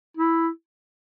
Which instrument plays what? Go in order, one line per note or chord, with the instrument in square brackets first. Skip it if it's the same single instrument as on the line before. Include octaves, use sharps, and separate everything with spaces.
[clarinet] E4